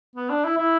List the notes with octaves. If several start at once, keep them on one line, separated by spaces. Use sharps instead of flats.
B3
D4
E4
E4